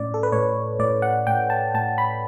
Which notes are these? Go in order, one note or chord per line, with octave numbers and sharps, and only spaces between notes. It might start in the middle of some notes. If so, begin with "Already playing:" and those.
Already playing: A2 C#4 D5
A4
B4
A2 C#5
A2 D5
F#5
A2 G5
A5
A2 A5
B5